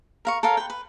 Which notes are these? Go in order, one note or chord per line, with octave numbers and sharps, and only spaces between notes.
A#4 F5 C#6
A4 A#4 C#5 F5
B4 G5
B4